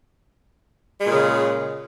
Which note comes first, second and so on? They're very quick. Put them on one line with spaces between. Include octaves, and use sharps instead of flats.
G#3 A#2 C#3